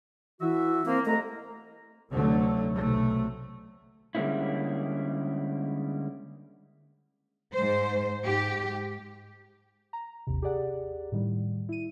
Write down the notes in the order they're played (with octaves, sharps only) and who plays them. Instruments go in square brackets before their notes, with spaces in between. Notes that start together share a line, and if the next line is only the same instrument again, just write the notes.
[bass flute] E3 [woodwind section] F#4 E5
[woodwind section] A#3 [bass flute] C4
[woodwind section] C2 G#3 A#5 [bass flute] A3
[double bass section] F1 D2 D3 F#3 A3
B1 C3 A3
[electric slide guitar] D3 G3 G#3 A#3 C#4 E4
[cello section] G#2 C5
G#2 G4
[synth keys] A#5
G#1 D#2 C3
G4 G#4 D5 F#5
A2 D#3 G3
E4 D#7